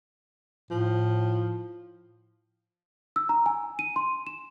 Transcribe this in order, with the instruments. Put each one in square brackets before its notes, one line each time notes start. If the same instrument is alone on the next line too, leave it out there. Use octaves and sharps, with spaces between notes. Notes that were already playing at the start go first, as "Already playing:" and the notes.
[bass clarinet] A2 [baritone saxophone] F3
[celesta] E6
A#5
G#5
D#7
C6
E7